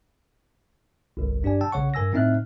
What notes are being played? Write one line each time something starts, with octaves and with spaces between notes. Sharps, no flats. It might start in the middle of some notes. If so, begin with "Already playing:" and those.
G1 C2
G2 D4 G4 D5 G#5
G5 A5 E6
A#1 C#3 C#5 F#5 C#6
G2 A#4 G#5 E6 A#6
A2 C4 D#4 E5 F6 F#6